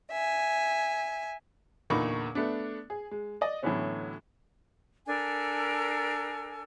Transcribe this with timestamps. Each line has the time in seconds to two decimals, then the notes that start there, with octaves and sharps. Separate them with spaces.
0.12 E5 G#5
1.90 E2 A#2 D3 D#4 B5 C#6
2.35 A3 B3 D4
2.90 G#4
3.11 G#3
3.41 D5 D#5
3.63 A2 D3 E3 F#3 B3 C#4
5.07 D4 A4 A#4 G#5